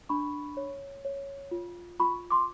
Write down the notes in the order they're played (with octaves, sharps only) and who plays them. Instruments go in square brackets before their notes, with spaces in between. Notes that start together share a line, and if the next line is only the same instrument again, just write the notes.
[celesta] D4 B5 C#6
C#5
C#5
F4
F4 B5 C#6
C6 D6